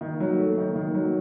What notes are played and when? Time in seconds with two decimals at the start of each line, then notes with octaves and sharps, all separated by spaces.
0.01 D#3
0.20 F#3
0.39 A3
0.58 D#3
0.76 D#3
0.95 F#3